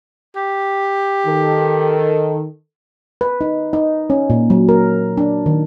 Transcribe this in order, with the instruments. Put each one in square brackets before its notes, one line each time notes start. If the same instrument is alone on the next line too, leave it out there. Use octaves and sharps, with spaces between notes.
[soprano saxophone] G4
[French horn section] D#3 A4
[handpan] B4
D#4
D#4
C#4
A#2
F#3
A#4
D4
D#3